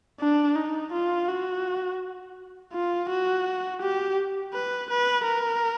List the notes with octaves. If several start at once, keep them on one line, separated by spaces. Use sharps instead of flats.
D4
D#4
F4
F#4
F4
F#4
G4
B4
B4
A#4